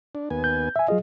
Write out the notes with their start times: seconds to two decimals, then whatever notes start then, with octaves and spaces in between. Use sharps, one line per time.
0.15 D4
0.30 D#2 B3 G#5
0.44 G6
0.76 E5 G#5
0.88 F#3 F4 G#4 D#5